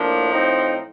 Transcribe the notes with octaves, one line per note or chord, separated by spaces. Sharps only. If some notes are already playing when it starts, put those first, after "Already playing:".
Already playing: A2 F3 A#3 D4
C4 D#4